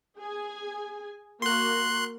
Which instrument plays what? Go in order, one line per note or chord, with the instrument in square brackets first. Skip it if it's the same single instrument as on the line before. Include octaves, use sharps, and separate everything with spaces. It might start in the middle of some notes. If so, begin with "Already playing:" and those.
[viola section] G#4 G#5
[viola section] A#3 F#4 [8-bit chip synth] C6 F#6